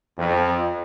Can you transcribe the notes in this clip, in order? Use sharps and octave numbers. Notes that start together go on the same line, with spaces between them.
F2